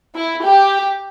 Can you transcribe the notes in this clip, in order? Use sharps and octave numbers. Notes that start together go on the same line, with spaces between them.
E4
G4